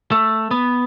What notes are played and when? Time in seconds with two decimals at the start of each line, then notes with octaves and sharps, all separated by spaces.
0.12 A3
0.51 B3